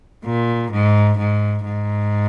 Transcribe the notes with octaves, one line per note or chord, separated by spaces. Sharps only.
A#2
G#2
G#2
G#2